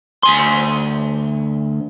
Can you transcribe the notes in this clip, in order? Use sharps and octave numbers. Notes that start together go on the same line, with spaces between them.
D2 G#5 C6